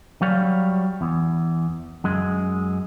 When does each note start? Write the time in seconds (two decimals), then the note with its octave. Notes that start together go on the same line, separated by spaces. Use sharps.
0.22 F#3 G3 C#5 F5
1.01 E2
2.04 F#2 G#3